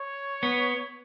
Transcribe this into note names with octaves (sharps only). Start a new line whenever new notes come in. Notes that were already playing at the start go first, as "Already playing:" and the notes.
Already playing: C#5
B3